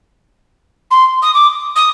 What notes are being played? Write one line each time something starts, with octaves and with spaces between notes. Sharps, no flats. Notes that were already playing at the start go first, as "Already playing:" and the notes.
C6
D#6
D6
D#6